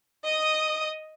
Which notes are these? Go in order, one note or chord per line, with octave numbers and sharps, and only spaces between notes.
D#5 D#6